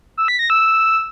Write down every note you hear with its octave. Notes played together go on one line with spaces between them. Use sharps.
E6
B6
A#6
E6